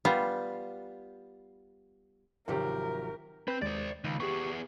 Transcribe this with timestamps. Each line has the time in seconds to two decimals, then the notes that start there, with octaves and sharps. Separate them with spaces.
0.05 G3 B3 F4
2.48 G#1 C3 F3 F#3 G4 A#4
3.48 C4 B4 G6
3.62 D#2 G#3 C5 D5 A6
4.04 C#2 D#3
4.20 B3 G4 G#4 C#6